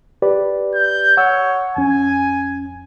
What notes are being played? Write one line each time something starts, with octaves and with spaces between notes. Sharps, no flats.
G4 B4 D5
G6
C#5 F#5 E6
F2 C#4 G#5